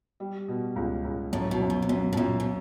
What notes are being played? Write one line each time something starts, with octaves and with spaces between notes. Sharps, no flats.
G3
B2
C#2
C#2
F#2 A2
B2
F#2
B2
C3
F#2 B2
A2
F#2 A#2
B2